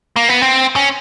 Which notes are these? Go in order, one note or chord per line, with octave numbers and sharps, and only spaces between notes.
A#3
B3
C4
C#4